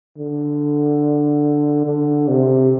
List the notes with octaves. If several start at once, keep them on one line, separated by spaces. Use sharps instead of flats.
D3
D3
C3